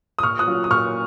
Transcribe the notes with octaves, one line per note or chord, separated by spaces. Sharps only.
D#6
A#2 C#6 F6
D#6 F#6
F#3 C#4 F4
D#6
A#2 C#6 F6